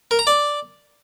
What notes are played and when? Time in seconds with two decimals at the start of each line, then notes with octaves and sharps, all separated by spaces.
0.11 A#4
0.19 A#5
0.27 D5